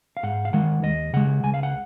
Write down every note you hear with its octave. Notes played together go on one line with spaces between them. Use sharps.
F5
G#2 F#5
F5
D#3 G#3 F#5
D#2 D#5
C#3 G#3 F#5
C#2 G#5
F5
F#5